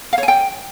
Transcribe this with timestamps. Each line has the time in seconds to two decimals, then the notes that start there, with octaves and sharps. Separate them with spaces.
0.13 F5
0.18 C#5
0.23 G#5
0.28 G5